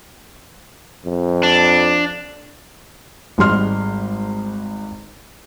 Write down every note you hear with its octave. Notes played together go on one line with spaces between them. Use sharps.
F2
D4
G#1 G#2 G3 C6 F6